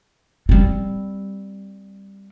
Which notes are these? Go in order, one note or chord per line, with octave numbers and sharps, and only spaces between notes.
G3 C4